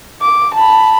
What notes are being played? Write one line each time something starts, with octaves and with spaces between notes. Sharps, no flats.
D6
A5 B5